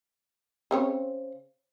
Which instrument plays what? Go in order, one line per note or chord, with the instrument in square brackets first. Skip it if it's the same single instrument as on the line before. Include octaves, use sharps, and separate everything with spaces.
[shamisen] C#3 C4 C#5